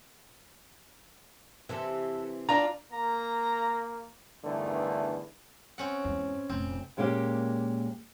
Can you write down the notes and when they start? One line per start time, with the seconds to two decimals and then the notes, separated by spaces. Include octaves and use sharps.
1.69 C3 E3 A4 E5
2.49 D4 F4 D5 A#5
2.92 A#3 A#5
4.44 E2 G2 D3 D#3 A3 B4
5.78 C4 C#4 F#5
6.04 E2 G#2
6.50 F1 A#1 C4
6.97 A#2 G#3 A#3 C#4 E4 G4